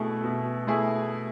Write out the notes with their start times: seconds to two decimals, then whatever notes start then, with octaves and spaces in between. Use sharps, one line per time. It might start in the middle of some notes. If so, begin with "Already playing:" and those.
Already playing: B2 A3 E4 G#4
0.24 B2
0.67 A3 E4 G#4